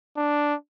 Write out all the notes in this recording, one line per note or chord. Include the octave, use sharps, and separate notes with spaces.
D4